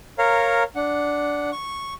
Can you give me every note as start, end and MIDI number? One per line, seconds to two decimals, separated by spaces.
0.18 0.63 70
0.18 0.63 73
0.18 0.63 77
0.18 0.63 82
0.75 1.50 62
0.75 1.50 78
1.52 1.94 85